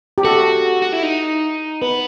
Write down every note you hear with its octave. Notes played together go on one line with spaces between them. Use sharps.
G4
F#4 A4
F#4
E4
D#4
B3 B4